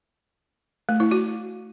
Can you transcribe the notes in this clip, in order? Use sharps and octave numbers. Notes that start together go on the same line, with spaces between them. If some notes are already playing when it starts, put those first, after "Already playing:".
A3
E4
F#4